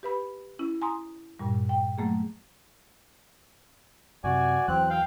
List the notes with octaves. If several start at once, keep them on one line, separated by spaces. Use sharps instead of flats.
G4 B4 B5
C#4 E4
G#5 A#5 C6 D#6
G2 A#2 G3
G5
F#3 A3 A#3 G#4
F#2 C3 F#4 D5 G#5
E2 F#3 C4 F#6
F5 G5